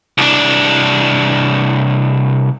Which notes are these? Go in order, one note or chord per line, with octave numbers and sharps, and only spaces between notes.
C2 D4